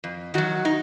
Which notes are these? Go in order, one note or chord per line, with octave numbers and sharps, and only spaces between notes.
F2
D#3 F#3 F#4
D#4